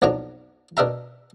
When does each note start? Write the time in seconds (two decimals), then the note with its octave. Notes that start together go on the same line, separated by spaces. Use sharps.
0.02 B1 F2 F#3 D4 A#5
0.77 B2 D4 A#4 E5 A#5